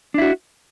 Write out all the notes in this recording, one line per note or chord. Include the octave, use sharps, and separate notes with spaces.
D4 E4 F#4